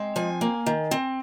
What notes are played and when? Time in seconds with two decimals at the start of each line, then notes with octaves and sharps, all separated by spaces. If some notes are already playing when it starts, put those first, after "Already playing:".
Already playing: G#3 C4
0.16 F3 G#5
0.41 A#3
0.66 D#3
0.91 C4